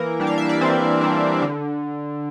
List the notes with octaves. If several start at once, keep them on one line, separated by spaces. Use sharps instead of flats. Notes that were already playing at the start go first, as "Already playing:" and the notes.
Already playing: E3 A#3 A#4
G3 D4
F5
E5
D5
E3 C4 C5
G3 D4
D3